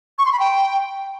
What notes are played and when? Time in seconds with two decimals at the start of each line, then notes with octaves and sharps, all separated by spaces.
0.18 C#6
0.25 C6
0.32 B5
0.40 G5